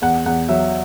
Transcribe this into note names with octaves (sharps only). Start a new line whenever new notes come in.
E2 F#5
E2 F#5
F#3 E5